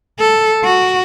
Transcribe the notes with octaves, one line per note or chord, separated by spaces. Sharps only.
A4
F#4